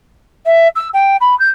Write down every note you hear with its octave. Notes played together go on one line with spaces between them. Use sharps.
E5
E6
G5
B5
G6